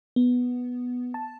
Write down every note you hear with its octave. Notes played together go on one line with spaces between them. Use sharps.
B3
A5